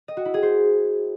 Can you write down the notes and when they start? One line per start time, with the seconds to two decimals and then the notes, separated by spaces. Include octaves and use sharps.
0.08 D#5
0.17 F#4
0.25 E4
0.34 G#4
0.43 C5